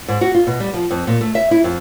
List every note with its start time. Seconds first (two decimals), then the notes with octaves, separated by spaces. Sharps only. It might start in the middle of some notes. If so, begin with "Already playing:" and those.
0.08 G#2
0.21 F#4
0.35 F4
0.47 B2
0.60 G3
0.74 F3
0.91 F2
1.07 A#2
1.21 A3
1.35 E5
1.51 E4
1.64 F2